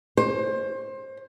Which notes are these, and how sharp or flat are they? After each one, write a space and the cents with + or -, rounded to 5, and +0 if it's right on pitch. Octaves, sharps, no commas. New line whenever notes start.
C5 +25